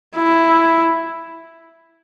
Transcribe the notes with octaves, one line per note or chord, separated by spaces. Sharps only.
E4